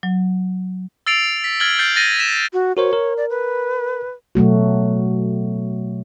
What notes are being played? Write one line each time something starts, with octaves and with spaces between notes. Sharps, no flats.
F#3
E6 A6 C7 D7 F7
B6
F6 G#6 A6 F#7 G7
F6 G6 A6 C7 D7
A6 A#6 D#7
B6 E7
F#4
F#4 A#4 C5 C#5
A#4
D5
B4
B2 F#3 A3 F#4